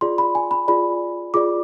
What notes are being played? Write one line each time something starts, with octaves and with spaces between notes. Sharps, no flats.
F4 G#4 D5 C6
B5
G#5
B5
F4 G#4 D5 B5
F4 G#4 D5 D6